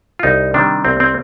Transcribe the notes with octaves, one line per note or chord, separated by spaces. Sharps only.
F4
C2 D#4
C3 D#3 G3 D4
C2 C4
C4